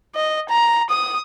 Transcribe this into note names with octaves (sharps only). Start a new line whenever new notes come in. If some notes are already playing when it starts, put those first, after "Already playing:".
D#5
A#5
D#6